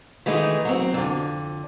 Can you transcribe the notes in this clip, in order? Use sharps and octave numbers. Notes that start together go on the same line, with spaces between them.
D#3 E3 G#3 A3 D#4
F#3 C4
F2 D3